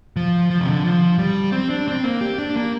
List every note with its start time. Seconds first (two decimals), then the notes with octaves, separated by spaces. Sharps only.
0.16 F3
0.50 F3
0.61 C3
0.67 D3
0.85 F3
1.18 G3
1.52 C4
1.70 D4
1.88 C4
2.04 A#3
2.21 G4
2.38 D4
2.56 A#3